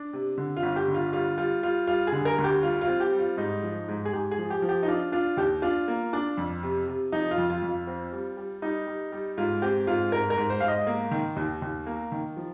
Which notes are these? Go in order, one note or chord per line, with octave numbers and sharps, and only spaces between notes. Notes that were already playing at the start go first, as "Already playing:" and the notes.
Already playing: D4
C3
D3
F4
G1
G4
D3
F4
G3 F4
G3 F4
G3 F4
G3 F4
G#4
D3
A#4
D2
G4
G3 F4
F4
C4
G4
G3
F4
G#2 D#4
F3
G#2
G#4
G#2 G4
G#4
F3
G4
F3
G4
D#4
D4 F4
D4 F4
D#2 G4
D4 F4
A#3
D4
F2
C3
C3
F3 D#4
F4
F2
F4
F2
F4
C4
G3
G3
G3 D#4
G3
G3
G#2 F4
C4 G4
G#2 F4
G#2 A#4
A#4
G#2
C5
G#2 F5
D#5
A#3
D#3
D#2
D#2
A#3
D#3
F3